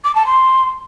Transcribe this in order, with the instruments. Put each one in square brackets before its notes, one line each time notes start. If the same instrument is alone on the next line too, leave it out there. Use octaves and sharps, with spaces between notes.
[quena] D6
A5
C6